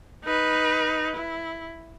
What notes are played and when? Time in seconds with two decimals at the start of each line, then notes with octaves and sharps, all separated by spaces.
0.24 D#4 B4
1.16 E4